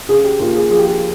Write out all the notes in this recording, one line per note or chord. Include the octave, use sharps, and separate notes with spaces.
C#3 G#4
G4
D#2 F4
G#4
F3 G#4
G4
G#4